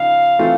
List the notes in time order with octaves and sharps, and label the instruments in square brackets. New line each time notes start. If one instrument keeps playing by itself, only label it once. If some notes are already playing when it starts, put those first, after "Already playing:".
Already playing: [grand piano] C#3 F3 D#4 [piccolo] F5
[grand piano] E3 A3 C4 F4